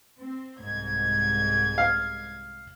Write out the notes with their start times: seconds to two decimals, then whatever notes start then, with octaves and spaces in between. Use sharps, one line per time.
0.18 C4
0.59 C2 G#2 G#6
1.78 F5